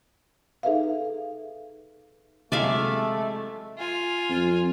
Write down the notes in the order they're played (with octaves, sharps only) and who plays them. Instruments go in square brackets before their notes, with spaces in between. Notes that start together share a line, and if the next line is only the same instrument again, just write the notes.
[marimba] D#4 G#4 A4 B4 E5 F5
[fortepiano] C3 E3 F#3 [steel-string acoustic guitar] G#3 [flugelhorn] A3 [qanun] D5 E5 F5
[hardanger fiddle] F4 G#5
[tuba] F2